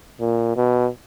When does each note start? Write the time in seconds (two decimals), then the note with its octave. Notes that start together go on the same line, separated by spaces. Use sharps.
0.20 A#2
0.56 B2